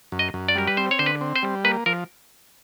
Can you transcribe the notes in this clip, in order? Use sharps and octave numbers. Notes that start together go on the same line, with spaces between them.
F#2
D#5
F#2
D5
G3 A#4
B4
C4 C5
C#5
D3 C5
B4
C4
C5
G3
A#3 B4
F3 A#4